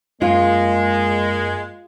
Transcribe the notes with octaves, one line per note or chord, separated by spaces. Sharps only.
F#2 G#3 A#3 F4 C6